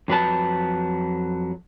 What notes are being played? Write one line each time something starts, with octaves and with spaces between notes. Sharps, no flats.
F2 F#3 B4 A5